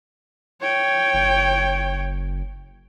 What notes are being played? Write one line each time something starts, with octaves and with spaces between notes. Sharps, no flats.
C#5 G5
F#1